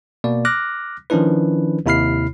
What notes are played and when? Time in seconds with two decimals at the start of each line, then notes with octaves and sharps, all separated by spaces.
0.24 B2 A#3 D5
0.45 D6 F6 F#6 A#6
1.10 D#3 F3 C#4 D4 E4 B4
1.86 D#2 C3 E4 B5 F6 C7